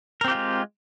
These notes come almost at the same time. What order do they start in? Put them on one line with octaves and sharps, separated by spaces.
A#4 C4 G4 F4 G#3